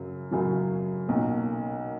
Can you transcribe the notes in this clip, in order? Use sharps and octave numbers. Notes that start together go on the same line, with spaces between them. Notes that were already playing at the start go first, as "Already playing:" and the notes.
Already playing: F#2 C#3 F#3
F#2 C#3 F#3
B1 A#2 A#3 C#4